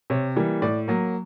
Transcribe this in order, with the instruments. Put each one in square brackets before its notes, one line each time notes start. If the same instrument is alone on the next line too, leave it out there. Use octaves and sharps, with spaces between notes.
[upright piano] C3 C#5
E3 G3 A#3
A2 D5
F#3 A#3